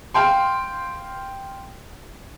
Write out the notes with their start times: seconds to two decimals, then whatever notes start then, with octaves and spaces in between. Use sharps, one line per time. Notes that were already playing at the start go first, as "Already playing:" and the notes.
0.14 F5 G5 C6